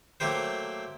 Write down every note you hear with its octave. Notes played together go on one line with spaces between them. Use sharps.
F#3 A3 A#3 G4 C5